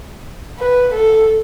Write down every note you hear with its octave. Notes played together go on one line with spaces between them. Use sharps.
B4
A4